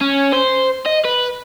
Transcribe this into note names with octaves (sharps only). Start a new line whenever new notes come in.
C#4
C5
D#5
B4